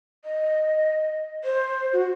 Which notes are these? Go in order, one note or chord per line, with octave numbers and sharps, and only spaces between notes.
D#5
C5
F#4